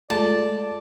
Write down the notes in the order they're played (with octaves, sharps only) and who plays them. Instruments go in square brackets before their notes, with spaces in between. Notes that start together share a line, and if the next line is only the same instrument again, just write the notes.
[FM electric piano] G#3 F4 [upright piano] A3 [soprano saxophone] D5 [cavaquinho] A5